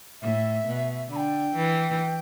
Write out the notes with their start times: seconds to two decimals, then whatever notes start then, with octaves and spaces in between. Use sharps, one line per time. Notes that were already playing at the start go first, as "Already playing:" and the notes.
0.21 A2 E5
0.67 B2
1.10 D3 B5
1.16 G5
1.55 E3